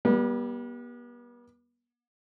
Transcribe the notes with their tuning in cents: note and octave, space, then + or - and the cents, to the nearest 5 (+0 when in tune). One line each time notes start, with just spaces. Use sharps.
G3 +0 B3 -40